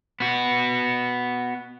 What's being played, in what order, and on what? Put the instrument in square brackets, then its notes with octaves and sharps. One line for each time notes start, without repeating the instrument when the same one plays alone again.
[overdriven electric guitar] B3 F#4